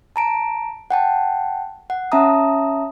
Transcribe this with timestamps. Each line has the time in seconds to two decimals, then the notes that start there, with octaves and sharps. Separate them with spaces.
0.16 A5 A#5 D7
0.91 F#5 G5 A5
1.90 F#5
2.12 C#4 E5 A5 A#5 D#6